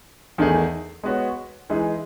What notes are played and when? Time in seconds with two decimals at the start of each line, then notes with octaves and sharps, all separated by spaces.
0.38 E2 D#3 A3 D#4 G#4
1.03 G#3 B3 F#4 C#5
1.70 E3 G#3 D#4 G#4